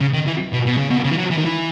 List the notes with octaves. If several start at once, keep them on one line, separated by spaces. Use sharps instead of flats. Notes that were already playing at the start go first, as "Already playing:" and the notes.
C#3
D#3
E3
B2
B2
C#3
B2
C#3
E3
F#3
E3
D#3
E3